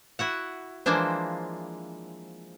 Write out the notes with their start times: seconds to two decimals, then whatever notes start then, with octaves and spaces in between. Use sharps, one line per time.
0.19 E4 F#4 F#5
0.86 E3 F3 G#3 A#3 D4 C5